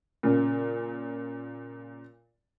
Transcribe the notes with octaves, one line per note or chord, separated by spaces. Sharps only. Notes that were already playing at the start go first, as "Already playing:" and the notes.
A#2 C#3